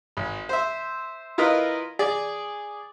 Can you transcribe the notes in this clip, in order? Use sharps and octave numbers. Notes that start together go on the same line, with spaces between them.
G#1
C5 E5
E4 F4 A#4 B4 D#5
G#4 D5